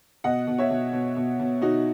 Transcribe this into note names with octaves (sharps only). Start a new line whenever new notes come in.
B2 D#5 F#5
B2
C#5 E5
B2
B2
B2
B2
B2 D#4 F#4